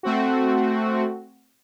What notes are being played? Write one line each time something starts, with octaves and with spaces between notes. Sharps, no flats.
A3 C4 F#4